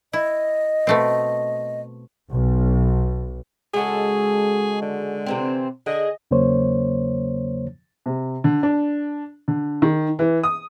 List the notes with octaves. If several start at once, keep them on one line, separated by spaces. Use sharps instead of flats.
E4 D#5
B2 A3 C4
B1
C#3 G#3 F#4 G#4 A4
D3
C3 E3 C4
D3 G#4 D#5
E2 C#3 F#3 A#3 C5 C#5
C3
D3
D4
D3
D#3
E3
D#6